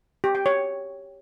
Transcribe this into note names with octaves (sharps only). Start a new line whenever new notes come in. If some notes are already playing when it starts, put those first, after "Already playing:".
G4
G5
C#5